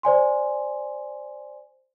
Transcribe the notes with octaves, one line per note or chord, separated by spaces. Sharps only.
C5 D5 G#5 C6